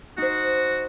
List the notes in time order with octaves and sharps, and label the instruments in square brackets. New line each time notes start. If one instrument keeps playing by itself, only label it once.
[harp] D#4 C5 [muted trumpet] F#4